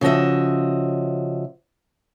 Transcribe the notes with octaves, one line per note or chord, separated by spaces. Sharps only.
C#3 F3 F#4 D#5 E5